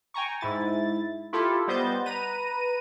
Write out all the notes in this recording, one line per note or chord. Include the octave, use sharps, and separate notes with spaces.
G5 G#5 A#5 C#6
G#2 E4 A6
E4 F4 G4 A4
G3 B3 C5 D#5 G6 A6
B4 A#5 D#7